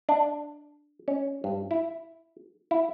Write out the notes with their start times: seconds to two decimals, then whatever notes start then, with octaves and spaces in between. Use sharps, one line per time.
0.09 D4
1.08 C#4
1.44 G2
1.71 E4
2.71 E4